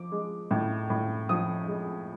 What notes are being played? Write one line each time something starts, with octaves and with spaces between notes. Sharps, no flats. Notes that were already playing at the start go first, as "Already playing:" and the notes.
Already playing: F3 D6
G#3
A2
A2
F3 D#6
G#3